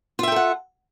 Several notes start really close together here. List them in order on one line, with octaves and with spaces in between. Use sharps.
F4 E5 G5 A4 F#5